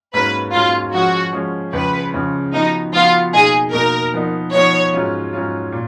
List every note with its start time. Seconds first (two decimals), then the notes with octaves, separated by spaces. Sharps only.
0.14 G#2 F#3 A#3 C#4 B4
0.53 G#2 F#3 A#3 C#4 F4
0.93 F3 G#3 C#4 F#4
1.33 F3 G#3 C#4
1.73 C#2 C#3 F3 B4
2.14 C#2 C#3 F3
2.53 F3 B3 D#4 F#4
2.93 F3 B3 F4 F#4
3.33 B2 A#3 D#4 G#4
3.73 B2 A#3 D#4 A#4
4.14 F3 B3 D#4
4.53 F3 B3 D#4 C#5
4.94 G#2 F#3 C#4 F4
5.33 G#2 F#3 C#4 F4
5.72 A#2